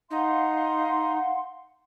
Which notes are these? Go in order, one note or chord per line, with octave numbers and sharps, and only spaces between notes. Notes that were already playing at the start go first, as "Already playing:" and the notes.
D#4 F5 F#5 C6